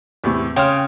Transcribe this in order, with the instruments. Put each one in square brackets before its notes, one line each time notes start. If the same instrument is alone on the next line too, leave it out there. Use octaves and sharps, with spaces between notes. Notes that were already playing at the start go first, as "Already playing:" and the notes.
[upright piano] E2 A2 C3
[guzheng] C#3 [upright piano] G5 C6 F6